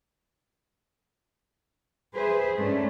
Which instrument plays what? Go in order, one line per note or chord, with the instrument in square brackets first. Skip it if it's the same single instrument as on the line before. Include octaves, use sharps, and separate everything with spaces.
[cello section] G#4 B4 C5 E5
G#2 A3 C#4 D4